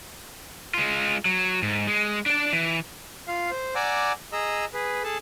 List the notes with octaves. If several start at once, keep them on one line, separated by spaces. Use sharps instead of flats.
G#3 F4
F#3
G#2
G#3
D4 D5
E3
F4 F5
C5
D5 F#5 G#5 A#5 D6 E6
G#4 D#5 A#5 E6
G#4 B4
G#4 A4 A5